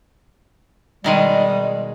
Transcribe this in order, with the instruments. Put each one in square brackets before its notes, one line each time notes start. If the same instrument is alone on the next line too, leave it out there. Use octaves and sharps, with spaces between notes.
[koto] B2 D#3 G#3 [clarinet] G3